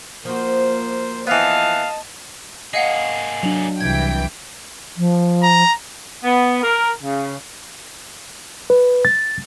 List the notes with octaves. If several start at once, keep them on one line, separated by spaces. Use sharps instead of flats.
F3 A#3 F#4 C5
E3 B3 D#5 F5 A5
A#3 G#4 D#5 F5 F#5
F#3 D4 F7 F#7
C2 E3 G5 G#6
F3
A#5
B3
A#4
C#3
B4
A6